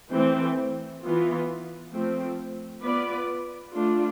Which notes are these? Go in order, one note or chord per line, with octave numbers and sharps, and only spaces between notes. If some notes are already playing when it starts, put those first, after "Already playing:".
E3 A3 C4
E3 B3 F4
F3 A3 C4
B3 F4 B4 D5
A3 D4 F4